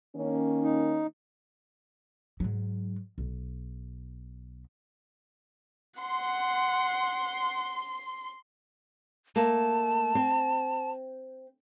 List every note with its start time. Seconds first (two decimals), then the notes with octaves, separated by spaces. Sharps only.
0.15 D#3 A#3 C#4
0.64 D#4
2.40 G#2 F#3
3.18 B1
6.01 F#5 C6
9.36 A3 A#3 A5
10.15 C4